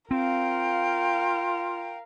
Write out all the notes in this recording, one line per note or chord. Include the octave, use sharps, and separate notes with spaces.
C4 F4 A#4 F5 G5